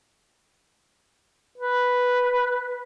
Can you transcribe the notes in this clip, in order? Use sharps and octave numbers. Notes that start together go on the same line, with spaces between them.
B4